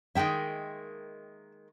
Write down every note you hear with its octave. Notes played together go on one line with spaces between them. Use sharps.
D#3 G#3 A#3 E5 G5